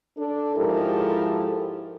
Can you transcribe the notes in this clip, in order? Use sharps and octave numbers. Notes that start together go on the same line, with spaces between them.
D4 A4
G#2 F3 E4 G4 A4 A#4